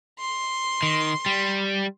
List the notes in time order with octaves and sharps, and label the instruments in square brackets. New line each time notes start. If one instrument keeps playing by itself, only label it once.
[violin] C6
[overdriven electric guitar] D#3
G3